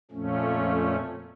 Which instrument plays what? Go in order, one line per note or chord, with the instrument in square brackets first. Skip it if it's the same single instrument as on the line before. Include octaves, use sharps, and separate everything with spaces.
[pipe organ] F2 A#2 F3 A3 C#4